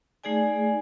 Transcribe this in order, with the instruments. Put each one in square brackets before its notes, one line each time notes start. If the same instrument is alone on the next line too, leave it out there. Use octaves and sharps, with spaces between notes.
[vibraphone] A3 D#4 G#4 D5 G#5